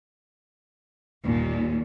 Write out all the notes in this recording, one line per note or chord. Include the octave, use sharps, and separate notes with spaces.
G1 D#2 A#2